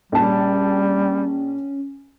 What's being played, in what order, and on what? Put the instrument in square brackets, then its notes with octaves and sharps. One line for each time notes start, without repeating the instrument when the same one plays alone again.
[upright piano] A#1 A5 [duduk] G3 [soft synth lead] C#4